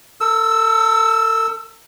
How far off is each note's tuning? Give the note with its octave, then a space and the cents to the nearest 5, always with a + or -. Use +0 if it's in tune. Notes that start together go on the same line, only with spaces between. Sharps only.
A4 +35 E6 -10